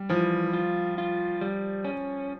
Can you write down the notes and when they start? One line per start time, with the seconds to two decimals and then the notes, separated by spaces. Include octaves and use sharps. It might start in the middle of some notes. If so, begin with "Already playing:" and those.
Already playing: G3
0.10 E3 F3
0.53 F4
0.98 F4
1.41 G3
1.85 C#4